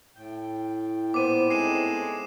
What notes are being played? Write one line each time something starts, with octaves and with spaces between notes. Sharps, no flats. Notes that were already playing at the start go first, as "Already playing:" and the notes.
A2 G5
A#2 B3 C5 D6 D#7
G#3 A3 B3 C4 D#4 C7 D#7 E7